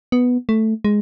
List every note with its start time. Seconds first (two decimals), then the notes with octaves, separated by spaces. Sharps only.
0.12 B3
0.49 A3
0.84 G#3